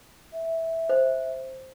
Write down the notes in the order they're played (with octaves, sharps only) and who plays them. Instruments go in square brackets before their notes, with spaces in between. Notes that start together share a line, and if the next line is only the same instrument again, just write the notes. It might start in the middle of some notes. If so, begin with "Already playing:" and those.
[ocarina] E5
[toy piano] C5